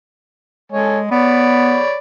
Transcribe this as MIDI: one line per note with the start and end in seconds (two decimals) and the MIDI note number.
0.72 1.07 56
0.72 0.99 69
0.72 0.99 73
0.72 0.99 80
1.11 1.80 59
1.11 1.98 73
1.11 1.98 74
1.11 1.98 83